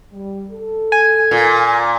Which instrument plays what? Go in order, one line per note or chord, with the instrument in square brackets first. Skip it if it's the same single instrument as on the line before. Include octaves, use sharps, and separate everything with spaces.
[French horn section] G3
A4
[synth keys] G#5
[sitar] A#2